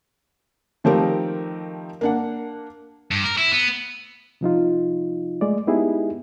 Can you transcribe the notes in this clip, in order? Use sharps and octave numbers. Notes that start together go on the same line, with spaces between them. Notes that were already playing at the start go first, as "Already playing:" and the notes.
D#3 F3 A3 C4 G4 A#4
A#3 D4 F#5
G2
A#4
E4
B3
C3 F3 D#4 F4
G#3 A3 D5
G#3 B3 D#4 E4 G4 G#4